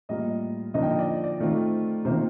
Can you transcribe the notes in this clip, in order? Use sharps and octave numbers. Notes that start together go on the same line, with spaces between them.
A2 G3 A#3 F4 D#5
D3 F3 A#3 D#4 D#5
G5
D#5
D5
D5
D#3 A3 C4 F4
C3 D#3 A#3 F4 C5